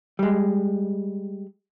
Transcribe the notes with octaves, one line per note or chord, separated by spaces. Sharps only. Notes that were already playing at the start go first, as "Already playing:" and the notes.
G3 G#3